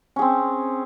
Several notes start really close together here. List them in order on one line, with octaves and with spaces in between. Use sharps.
C#4 G#4 C4